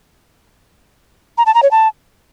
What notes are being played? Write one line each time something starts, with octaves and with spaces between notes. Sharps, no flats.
A#5
A5
A#5
C#5
A5